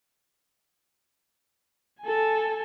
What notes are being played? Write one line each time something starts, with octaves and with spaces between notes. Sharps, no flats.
A4 G#5